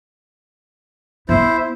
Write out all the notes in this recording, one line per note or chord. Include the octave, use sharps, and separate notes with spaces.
B3 E4 C5